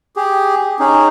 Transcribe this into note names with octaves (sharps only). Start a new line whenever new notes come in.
G4 G#4
C#4 D#4 G#4